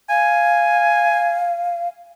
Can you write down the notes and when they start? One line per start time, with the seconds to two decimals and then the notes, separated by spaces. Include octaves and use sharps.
0.10 F5 G#5